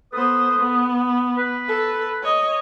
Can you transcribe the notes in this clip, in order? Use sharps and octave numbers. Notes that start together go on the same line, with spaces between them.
B3 A4 B4 C5 D#6
B3
B4
A4
C#5 D#5